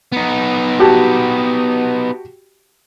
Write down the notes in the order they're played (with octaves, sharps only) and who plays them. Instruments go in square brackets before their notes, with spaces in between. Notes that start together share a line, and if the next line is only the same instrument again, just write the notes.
[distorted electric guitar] B3 D#4
[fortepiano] F#4 G4 A5